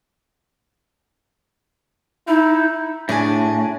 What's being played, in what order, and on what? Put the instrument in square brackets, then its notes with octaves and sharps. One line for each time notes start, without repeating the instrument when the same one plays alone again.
[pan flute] D#4 [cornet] E4
[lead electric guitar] A2 [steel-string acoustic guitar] D4 G#4 G#5